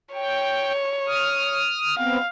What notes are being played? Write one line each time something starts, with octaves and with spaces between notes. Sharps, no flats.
C#5 G5
D#6 F6
B3 C4 F5